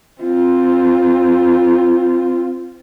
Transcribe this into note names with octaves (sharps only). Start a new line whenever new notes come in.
C4 F4